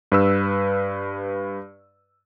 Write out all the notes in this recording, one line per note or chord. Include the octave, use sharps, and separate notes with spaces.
G2 B4 E6